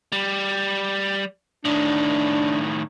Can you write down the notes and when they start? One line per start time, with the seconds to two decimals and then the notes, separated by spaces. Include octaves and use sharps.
0.12 G3
1.65 A2 D#3 D4